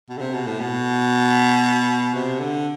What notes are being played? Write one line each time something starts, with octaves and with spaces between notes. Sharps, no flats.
B2
D3
C3
B2
A2
B2
C3
D3